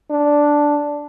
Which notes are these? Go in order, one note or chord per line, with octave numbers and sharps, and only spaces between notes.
D4